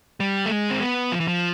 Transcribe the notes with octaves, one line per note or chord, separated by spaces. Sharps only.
G3
A3
G#3
C4
B3
F3
E3
F3